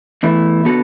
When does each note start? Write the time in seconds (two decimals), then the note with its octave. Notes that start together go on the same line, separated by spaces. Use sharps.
0.23 E2 E3 A3 E4
0.65 D3 B3 F#4 A4